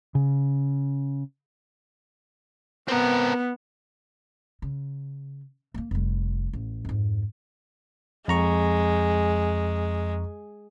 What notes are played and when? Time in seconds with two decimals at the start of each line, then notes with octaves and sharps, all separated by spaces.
0.15 C#3
2.88 B3 C4 A#4
4.62 C#3
5.74 A3 A#3
5.91 F1 G3
6.53 A1
6.85 F2 G#2
8.28 F2 G#3 A#5 C#6